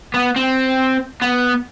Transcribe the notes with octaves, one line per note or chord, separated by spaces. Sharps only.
B3
C4
B3